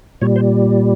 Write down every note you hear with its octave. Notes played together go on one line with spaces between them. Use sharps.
A#2 G3 C#5
C5